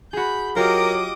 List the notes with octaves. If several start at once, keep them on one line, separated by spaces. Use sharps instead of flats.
F#4 G#4 B5 G6
F#3 F4 G4 A#4 D#5 D6 D#6